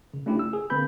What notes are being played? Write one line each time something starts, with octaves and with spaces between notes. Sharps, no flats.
C#3
A3 C#4 D4 E4 F4 G4
E6
G#4
D3 A#3 C4 B4 B5 G6